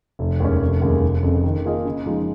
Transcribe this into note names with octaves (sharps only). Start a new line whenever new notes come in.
F1
D#2 D#3 G#3 C#4
F1
D#2 C#3 G#3
F1
F2 C#3
D#3
A#3 F4 G#4 D#5
C#3
F3 G#3 D#4